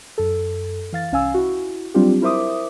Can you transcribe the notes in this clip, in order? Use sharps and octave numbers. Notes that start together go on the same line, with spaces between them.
F#2 A4
E3 F5 A6
C2 C#4 F5 G#5 E6
E4 F#4
F#3 G3 C4 D4 F4 G4
E4 A#4 C5 E5 D6 D#6